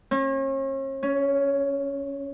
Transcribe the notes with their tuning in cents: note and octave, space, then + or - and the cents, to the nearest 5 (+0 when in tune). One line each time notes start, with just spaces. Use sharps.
C#4 -40
C#4 +10